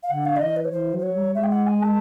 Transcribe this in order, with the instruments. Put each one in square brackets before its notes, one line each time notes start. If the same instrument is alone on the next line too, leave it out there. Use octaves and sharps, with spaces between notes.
[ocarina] F5
[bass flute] D3 [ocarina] F#5
[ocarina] F5
D5
[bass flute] E3 [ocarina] D#5
[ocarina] B4
C#5
[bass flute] E3 [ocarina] C5
[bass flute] F#3
[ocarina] C5
C#5
[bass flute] G3
[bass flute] G#3 [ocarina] E5
[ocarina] G5
F#5
G#5
A5